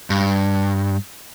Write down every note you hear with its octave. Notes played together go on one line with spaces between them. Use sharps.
G2